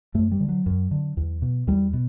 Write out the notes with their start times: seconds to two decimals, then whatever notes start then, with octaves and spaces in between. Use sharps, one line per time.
0.14 F#2 A3
0.32 G3
0.40 D3
0.49 F#3
0.66 F#2
0.91 D3
1.17 E2
1.42 B2
1.67 E2 G3
1.93 B2